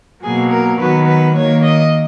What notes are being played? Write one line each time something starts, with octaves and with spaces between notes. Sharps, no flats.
B2 F#3 A#3 G#4
A#4
D#3 F#3 B3 B4
B4
D#3 A#3 C#5
D#5